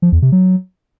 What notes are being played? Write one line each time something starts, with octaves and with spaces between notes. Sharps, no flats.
F3
E2
C3
F#3